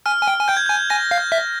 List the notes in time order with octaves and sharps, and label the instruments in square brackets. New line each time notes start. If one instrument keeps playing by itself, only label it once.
[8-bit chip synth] G#5 [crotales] F6
[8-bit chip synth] G#5
G5
G#5
[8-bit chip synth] G5 [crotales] G6
[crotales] G#6
G6
[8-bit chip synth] G#5
[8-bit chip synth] G#5 [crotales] A#6
[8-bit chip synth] F5
[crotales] G6
[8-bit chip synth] E5